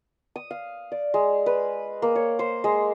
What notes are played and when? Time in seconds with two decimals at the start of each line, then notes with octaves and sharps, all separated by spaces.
0.36 D#6
0.51 F5
0.92 D5
1.14 G#3
1.46 B4
2.02 A#3
2.16 C#5
2.39 C5
2.64 G#3